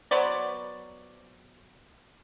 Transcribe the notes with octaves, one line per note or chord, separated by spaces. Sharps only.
F#3 B3 C5 D5